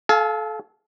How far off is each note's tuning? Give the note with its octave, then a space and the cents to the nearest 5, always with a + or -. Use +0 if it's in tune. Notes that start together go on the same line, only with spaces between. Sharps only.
A4 -25 F5 +0 G#5 +25